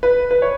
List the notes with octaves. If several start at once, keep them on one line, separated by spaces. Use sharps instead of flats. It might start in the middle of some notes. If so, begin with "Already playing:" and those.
B4
B4
C#5